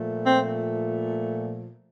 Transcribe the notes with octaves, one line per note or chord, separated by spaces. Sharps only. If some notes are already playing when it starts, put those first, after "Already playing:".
Already playing: A#2 F3 A3
C4